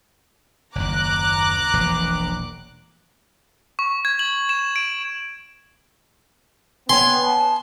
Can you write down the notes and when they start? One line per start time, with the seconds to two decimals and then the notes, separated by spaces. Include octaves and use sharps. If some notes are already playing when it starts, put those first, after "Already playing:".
0.75 F#1 D#2 A#5 D6 F#6
1.73 E1 A#1 E3
3.79 C#6
4.05 G#6
4.19 F#7
4.49 E7
4.76 D7
6.89 B3 C#4 G5 G#5 C6
7.22 A5